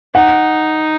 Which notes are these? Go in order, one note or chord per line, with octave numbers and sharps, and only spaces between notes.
D#4 F#5